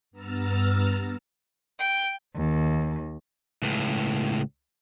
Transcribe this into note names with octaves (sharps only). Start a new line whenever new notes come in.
G2 B3 A#5 E6 F6 A6
G5
D#2
C#2 A2